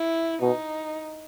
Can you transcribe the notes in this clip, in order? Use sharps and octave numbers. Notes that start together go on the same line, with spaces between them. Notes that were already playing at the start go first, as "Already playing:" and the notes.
Already playing: E4
B2 D#4